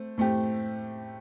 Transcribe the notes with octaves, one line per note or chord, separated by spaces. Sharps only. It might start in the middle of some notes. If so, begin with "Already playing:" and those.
Already playing: A3 C4
A2 A3 C4 G4